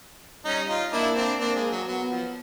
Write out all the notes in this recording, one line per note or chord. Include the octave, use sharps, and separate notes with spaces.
G3 C#4 D#4
D#4 F4
A#3 D4 E4
C4 D4
A#3 C4 D4
G#3
F#3
F#3 B3
F3